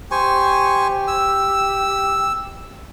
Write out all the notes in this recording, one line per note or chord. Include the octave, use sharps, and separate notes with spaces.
G4 C5 G#5 C#6
E6